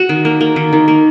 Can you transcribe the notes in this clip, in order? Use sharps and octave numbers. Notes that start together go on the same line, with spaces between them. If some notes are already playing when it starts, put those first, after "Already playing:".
Already playing: F#4
D#3
A#3
A#3
D#3
D#3
A#3